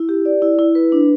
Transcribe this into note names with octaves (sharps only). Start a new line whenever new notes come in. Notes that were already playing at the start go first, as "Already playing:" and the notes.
Already playing: E4
G4
D5
E4
E4
B4
D4